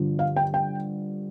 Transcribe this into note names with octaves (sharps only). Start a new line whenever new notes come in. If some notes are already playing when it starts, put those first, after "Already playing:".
Already playing: G2 D3 F3
F5
G5
G5